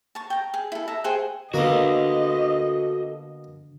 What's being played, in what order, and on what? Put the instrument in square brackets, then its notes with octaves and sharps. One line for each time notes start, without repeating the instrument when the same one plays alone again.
[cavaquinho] A5 C#6
G5 A#5
G#4
E4 A4
E5 A5 A#5
G#4 C5 F#5 G5
[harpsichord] B2 A#3 A#5 [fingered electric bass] D3 [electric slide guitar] F#4 A4 [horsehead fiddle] D#5